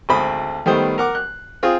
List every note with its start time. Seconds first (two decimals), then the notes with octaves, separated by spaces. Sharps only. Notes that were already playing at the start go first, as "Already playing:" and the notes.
0.09 G#1 D2 C5 B5 D#6
0.66 D#3 G3 A3 B3 C5
0.98 A#4 F#5 D6
1.15 F#6
1.63 C4 F4 G#4